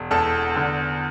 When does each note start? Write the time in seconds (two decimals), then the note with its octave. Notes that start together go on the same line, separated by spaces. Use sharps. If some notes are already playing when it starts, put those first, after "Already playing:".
Already playing: E1
0.11 E2 A4 A5
0.56 D3